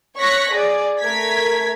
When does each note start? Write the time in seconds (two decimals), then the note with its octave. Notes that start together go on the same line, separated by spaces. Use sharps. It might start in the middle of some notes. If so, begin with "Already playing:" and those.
0.18 C#5 C#6 F#6 A#6 B6
0.52 G#4 D5
0.99 A3 A#4 G#6 B6